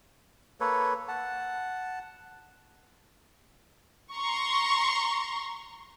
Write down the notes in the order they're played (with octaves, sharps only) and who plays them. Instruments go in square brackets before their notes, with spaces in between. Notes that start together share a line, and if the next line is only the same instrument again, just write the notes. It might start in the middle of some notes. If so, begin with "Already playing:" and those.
[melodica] A#3 A4 B4 C#5
F#5 A5
[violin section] A#5 C6 C#6